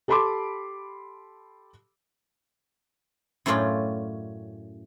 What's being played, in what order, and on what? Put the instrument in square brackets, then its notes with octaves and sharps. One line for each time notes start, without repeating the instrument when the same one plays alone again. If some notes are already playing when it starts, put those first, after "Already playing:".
[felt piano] G4 A4 A5 B5 C6 D6
[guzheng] F#2 A2 C#4 F4 D5 G5